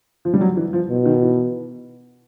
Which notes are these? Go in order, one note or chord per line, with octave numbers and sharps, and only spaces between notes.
F3
G3
F#3
E3
F3
B2
D#3
E3